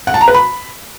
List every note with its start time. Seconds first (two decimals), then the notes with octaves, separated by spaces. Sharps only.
0.07 F#5
0.14 A5
0.21 A#5
0.28 B4
0.34 B5